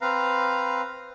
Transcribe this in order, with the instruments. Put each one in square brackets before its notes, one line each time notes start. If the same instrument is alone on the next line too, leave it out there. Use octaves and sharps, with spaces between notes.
[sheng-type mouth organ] C4 B4 F5 A#5